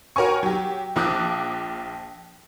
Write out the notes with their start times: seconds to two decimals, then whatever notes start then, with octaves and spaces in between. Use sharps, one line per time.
0.16 F#4 A#4 C#5 G5 G#5 C#6
0.43 F#3 G4
0.96 A#1 F3 D6 D#6 F#6